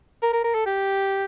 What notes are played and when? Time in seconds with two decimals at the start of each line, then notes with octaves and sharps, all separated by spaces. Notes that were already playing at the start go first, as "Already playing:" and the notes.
0.23 A#4
0.33 A#4
0.44 A#4
0.55 A4
0.66 G4